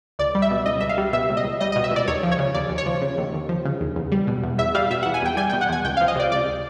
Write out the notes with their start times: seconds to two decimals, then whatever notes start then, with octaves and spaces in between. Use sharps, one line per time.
0.19 C#2 D5
0.35 G3
0.42 E5
0.51 B2
0.66 C#2 D#5
0.80 C#2 E5
0.89 F5
0.98 G3
1.13 B2 E5
1.29 C#2
1.37 D#5
1.44 C#2
1.60 G3 D#5
1.72 B2 D#5
1.84 E5
1.91 C#2 D5
2.07 D#2 C#5
2.23 F3
2.32 C#5
2.39 C#3
2.54 D#2 D5
2.70 D#2
2.78 C#5
2.86 F3
3.02 C#3
3.18 D#2
3.34 D#2
3.49 F3
3.65 C#3
3.81 D#2
3.96 E2
4.12 G3
4.27 B2
4.43 E2
4.58 E2 E5
4.75 G3 F5
4.90 B2 E5
5.03 E2 F#5
5.14 G#5
5.22 E2 G5
5.37 G3 G#5
5.50 B2 G5
5.61 F#5
5.69 E2 G#5
5.85 C#2 G5
5.97 F3 F5
6.08 D#5
6.16 C3 D5
6.32 C#2 D5